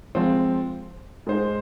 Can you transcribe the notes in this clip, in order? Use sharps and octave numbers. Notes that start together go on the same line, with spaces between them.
F3 G#3 C4
G#2 G#3 D#4 C5